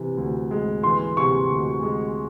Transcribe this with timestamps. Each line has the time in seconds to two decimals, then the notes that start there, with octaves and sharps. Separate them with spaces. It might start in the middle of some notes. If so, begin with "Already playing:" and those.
Already playing: C3 E3
0.17 D2
0.51 G#3
0.83 E3 C6
1.17 C3 C#6
1.51 D2
1.83 G#3